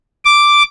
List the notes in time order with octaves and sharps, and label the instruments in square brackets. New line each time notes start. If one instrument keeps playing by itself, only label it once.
[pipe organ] D6